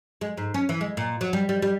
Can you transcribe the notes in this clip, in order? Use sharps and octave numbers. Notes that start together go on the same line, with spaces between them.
G#3
G#2
C#4
E3
G#3
A#2
F#3
G3
G3
G3